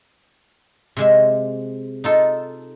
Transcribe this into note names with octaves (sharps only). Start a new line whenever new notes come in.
C3 G#3 E5
D#4 F4 A4